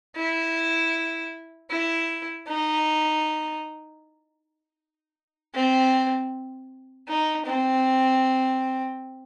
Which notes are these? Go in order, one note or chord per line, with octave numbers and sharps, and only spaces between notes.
E4
E4
D#4
C4
D#4
C4